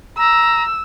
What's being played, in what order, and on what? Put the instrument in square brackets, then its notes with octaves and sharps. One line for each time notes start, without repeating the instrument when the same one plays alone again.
[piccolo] A#5 [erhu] E6